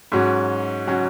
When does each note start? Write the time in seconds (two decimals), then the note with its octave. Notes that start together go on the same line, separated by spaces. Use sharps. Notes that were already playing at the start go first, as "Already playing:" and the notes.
0.12 G#2 F#3 C#4 F#4
0.87 F#3 C#4 F#4